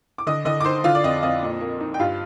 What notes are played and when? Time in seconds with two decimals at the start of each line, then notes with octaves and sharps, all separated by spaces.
0.18 D6
0.27 D3 D#5 D#6
0.45 D3 D#5 D#6
0.60 D6
0.64 D#4 C5 C6
0.84 D3 F4 F5
0.95 D5
1.04 F2 D#5
1.23 F2 D#5
1.43 A#2
1.61 A#3
1.80 D#4
1.94 G5
1.99 G2 F4 F5